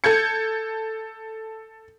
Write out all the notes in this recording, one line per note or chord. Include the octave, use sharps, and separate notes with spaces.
A4 G6 G#6 C#7